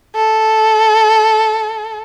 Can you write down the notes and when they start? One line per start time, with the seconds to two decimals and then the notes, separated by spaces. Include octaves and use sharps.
0.16 A4